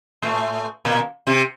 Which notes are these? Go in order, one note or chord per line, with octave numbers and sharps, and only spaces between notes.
A2 A3
A#2 A#3
C3 C4